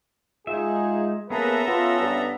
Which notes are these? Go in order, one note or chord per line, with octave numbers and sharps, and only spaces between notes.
G#3 D#4 F4 G#4 E5
A#3 B3 C#4 G#4 A4 B4 E5 A#5
B3 C#4 F4
G2